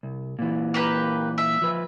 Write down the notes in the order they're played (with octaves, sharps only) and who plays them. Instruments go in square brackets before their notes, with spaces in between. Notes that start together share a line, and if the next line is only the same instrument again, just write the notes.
[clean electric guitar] C2
A#2 E3
[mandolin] A#3 G4 B4
E5
[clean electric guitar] F3 B4